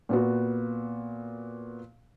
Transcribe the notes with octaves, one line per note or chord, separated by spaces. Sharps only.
A#2 B3 F#4